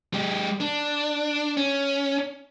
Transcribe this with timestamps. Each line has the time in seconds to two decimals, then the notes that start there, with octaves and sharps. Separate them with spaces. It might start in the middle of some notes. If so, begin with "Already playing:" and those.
0.13 G#3 G4
0.61 D4
1.57 C#4